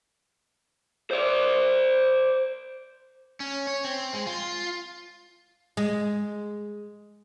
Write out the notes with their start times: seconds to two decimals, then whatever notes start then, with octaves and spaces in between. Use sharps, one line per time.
1.11 C5 D5
3.40 C#4
3.67 C#5
3.85 C4
4.13 G#3
4.27 F4
5.77 G#3